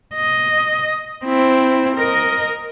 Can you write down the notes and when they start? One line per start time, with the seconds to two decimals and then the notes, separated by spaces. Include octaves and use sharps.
0.14 D#5
1.25 C4 E4
1.95 A#4 D#5